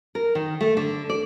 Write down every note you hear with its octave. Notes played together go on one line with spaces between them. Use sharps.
A#4
D#3
A3
D3
D5